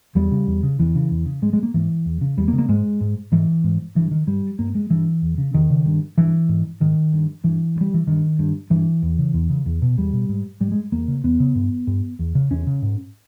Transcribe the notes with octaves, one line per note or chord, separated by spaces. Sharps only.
E2 G3
C#3
E2
C#3
E2 E3
C#3
E2
C#3
G#2 G#3
G#3
A#3
G#2 E3
E2
C#3
E2 G3
A#3
C#3
A#3
G#2 G#3
G#2
G#2 E3
G#2
G2 E3
D#3
G2 G3
G2 A#3
G#3
G2 E3
E2
C#3
E2 D#3
C#3
G2
G2 E3
G#2
G#2 D#3
G2
G2 E3
G2
G3
E3
G2 D#3
G2
G2 E3
E2
C#3
E2
C#3
E2
B2
E2 G3
B2
G#2
G#2 G3
G#3
E2 A#3
C#3
E2 B3
C#3
G2
G2
E2
C#3
E2 C#4
C#3
G#2